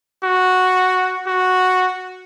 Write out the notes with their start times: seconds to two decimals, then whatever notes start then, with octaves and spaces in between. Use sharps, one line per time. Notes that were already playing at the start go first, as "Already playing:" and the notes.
0.24 F#4
1.27 F#4